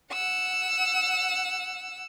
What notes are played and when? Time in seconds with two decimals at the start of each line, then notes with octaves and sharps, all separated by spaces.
0.12 F#5 E6